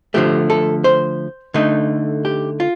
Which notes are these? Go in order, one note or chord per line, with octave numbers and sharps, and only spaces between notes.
D3 F3 A3 G4
A4
C5
D3 A3 D#4
G4
F4